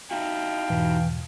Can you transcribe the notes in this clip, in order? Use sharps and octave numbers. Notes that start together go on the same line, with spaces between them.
D#4 E4 F#4 F5 G5 A5
E2 G#2 B2 E3